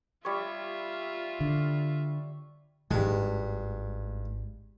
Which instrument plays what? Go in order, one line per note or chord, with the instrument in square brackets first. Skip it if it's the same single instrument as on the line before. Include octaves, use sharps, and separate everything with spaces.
[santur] G3 C#5 [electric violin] F4 E5
[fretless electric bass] D3
[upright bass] G#1 [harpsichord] G2 G#3